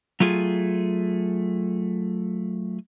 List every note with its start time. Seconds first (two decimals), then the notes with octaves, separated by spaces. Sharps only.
0.20 F#3 A3 F4 G#4